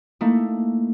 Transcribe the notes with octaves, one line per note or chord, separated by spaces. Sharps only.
A3 A#3 D#4 E4